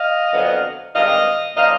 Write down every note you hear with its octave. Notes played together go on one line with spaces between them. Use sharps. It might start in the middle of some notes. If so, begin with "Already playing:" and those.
Already playing: D#5 F5
F2 D3 F#3 B3
G2 D#3 G#3 C4 D#5 F5
A#2 F3 A#3 C#4 D#5 F5